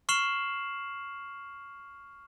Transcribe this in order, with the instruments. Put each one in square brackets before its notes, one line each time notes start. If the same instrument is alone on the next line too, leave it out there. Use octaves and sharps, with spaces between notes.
[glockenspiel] C#6 F6 C7 E7 F#7